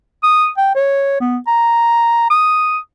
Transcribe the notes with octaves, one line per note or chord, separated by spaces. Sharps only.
D#6
G5
C#5
B3
A#5
D#6